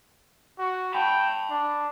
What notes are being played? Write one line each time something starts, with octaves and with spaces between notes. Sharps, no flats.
F#4
G5 A5 B5
D4